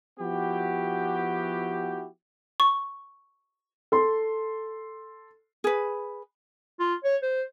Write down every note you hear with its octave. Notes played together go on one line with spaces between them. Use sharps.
F3 B3 E4 F#4 G4
C#6
A4 C6
G#4 B4
F4
C#5
C5